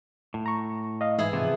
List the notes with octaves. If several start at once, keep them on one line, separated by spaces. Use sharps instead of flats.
A2
A#5 C#6
D#5 F5
G#2 E3 E4 G#4
C3 F3 B3